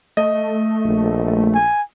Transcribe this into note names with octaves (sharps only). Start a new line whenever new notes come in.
A3 D#5
A#1
G#5